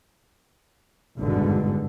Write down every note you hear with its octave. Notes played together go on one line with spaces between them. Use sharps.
G#1 E2 G2 B2 D3 G#3